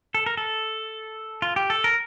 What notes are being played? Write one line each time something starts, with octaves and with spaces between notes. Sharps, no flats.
A4
A#4
A4
F4
G4
A4
A#4